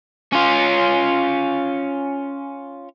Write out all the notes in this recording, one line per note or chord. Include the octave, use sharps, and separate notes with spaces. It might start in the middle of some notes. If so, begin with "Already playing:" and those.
C#4 F4